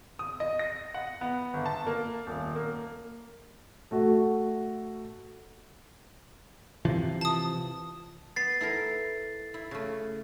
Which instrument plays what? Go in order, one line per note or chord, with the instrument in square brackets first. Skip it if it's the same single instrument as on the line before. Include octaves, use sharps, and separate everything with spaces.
[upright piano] D#6
D#5
A#6
F#5
B3
G1
A5
A#3
D#1
A#3
A3 F#4
[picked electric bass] C3 E3 F3
[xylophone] A5 D#6
[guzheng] B3 [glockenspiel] A6 C7
[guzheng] E4 A4 A#4
E4
C#3 A3